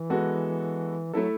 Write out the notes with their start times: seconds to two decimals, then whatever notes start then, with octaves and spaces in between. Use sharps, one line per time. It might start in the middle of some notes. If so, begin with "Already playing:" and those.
Already playing: E3
0.10 G#3 B3 F#4 A4
1.13 F#3 A3 E4 A4